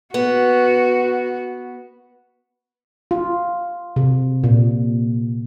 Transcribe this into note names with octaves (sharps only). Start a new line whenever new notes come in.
B3 F#4
F4
C3
A#2